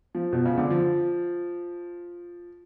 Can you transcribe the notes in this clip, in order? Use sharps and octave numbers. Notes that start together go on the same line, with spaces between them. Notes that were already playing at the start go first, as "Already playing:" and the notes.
F3
B2
C#3
D3
F3